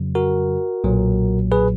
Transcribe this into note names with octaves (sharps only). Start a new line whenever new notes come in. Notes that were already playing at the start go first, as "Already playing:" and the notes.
Already playing: F2 C#3 F#3
F#4 A#4
B1 A#2 F#3
G#4 B4